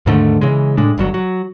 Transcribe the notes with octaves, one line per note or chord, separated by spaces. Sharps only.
D#2 G#2 D3 A3
C#3 E3 G#3
A2 G#3 D4
G1 G2 F#3
F#3